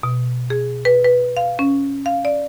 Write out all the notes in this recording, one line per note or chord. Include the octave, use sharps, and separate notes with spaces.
B2
G#4
B4
B4
F5
C#4
F5
D5